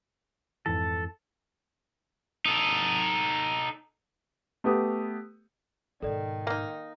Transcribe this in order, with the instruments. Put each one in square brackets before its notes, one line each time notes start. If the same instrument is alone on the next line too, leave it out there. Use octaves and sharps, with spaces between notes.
[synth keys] F2 G#2 E3 [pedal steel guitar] A4
[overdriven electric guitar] D#4 A4
[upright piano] A3 B3 G4 D#6
[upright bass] G#2 B2 [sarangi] D#3 [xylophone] A4 D5
[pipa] A#3 D#4